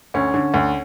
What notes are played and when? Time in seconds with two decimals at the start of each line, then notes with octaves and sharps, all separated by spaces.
0.14 D2 C#4
0.34 D3
0.54 D2